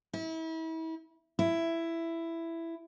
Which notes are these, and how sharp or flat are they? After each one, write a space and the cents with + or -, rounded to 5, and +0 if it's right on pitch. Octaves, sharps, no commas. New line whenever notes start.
E4 -35
E4 +10